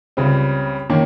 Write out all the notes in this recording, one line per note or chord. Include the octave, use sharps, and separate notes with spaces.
C#2 C#3 G3 C4
D#3 A#3 C#4